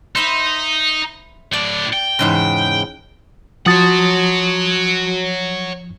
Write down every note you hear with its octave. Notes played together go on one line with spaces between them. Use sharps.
D#4 C5 E5 B5
A2 D4 D5
G5
E2 G#2 C#3
F3 F#4 C#5 F#5 A5 C6 D#6 A6